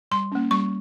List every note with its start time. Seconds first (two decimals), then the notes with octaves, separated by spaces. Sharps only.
0.11 G3 C6
0.32 A#3 C#4
0.51 G3 C#6